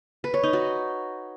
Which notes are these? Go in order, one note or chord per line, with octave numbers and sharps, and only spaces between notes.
B4
C#5
D#4
F#4